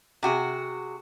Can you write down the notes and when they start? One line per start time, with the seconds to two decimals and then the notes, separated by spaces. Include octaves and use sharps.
0.23 C3 F#4 G#4